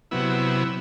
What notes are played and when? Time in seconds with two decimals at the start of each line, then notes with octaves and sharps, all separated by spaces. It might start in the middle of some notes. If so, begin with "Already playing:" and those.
0.11 C3 F#3 B3 E4